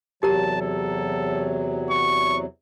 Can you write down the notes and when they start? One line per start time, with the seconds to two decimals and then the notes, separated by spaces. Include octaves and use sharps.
0.23 E2 C3 F#3 G4 A#4 A5 A#5
0.62 A4
1.91 C#6